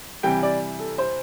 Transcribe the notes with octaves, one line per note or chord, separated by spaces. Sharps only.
C3 E3 G3 G5
D5
A4
C5